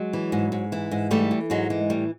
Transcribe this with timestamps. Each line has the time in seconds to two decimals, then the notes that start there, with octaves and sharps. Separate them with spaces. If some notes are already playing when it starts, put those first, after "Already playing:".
Already playing: F#3 G#3
0.13 E3
0.32 G#2
0.52 G#2
0.72 E3
0.91 G#2
1.11 E3 G3 A3
1.31 E3
1.50 G#2 F#3 G#3
1.70 E3
1.90 A2 G3